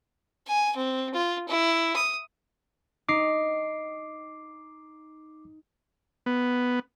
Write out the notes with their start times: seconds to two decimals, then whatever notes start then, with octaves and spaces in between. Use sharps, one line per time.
0.47 G#5
0.76 C4
1.14 F4
1.48 E4
1.96 D#6
3.09 D#4 D6 C7
6.26 B3